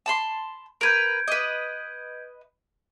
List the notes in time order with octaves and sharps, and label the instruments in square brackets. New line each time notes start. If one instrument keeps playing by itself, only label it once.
[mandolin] A5 B5 C6
[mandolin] A#4 B4 [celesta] G6 G#6 D7
[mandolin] B4 D#5